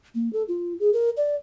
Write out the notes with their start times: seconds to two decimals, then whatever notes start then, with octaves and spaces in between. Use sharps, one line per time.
0.15 A#3
0.33 A4
0.48 F4
0.80 G#4
0.93 A#4
1.17 D5